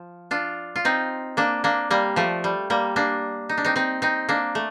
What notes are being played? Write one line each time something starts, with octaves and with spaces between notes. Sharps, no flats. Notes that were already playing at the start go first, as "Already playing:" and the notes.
Already playing: F3
D4 F4
F4
C4 D#4
A#3 D4
A#3 D4
G3 A#3
F3 A3
G3
G3 A#3
A#3 D4
D#4
D4
C4 D#4
C4 D#4
C4 D#4
A#3 D4
A3